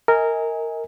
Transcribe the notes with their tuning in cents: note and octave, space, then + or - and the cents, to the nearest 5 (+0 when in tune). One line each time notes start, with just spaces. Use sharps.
A#4 -15 D#5 +35 G#5 -10